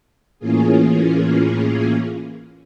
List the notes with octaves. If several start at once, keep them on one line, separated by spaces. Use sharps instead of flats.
A2 E3 A#3 C#4 F4 G#4